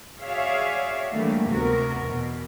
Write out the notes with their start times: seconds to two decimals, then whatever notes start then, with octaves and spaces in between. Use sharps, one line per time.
0.21 F#4 G#4 C#5 D5 E5 F5
1.12 D3 E3 F#3 G3 A3 A#3
1.48 D2 C3 B3 F#4 A#4
2.03 E2 B2